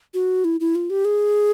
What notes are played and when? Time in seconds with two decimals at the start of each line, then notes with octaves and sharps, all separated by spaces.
0.14 F#4
0.45 E4
0.60 E4
0.75 F4
0.90 G4
1.05 G#4